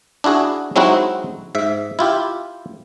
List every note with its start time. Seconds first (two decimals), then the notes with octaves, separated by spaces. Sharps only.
0.24 D4 E4 F#4 G#4
0.76 F#3 G#3 C4 D#4 E4 F#4
1.55 G#2 E5
1.99 E4 F4 G4